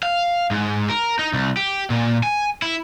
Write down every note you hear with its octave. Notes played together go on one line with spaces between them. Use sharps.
F5
G#2
A#4
D#4
C2
G4
A#2
G#5
E4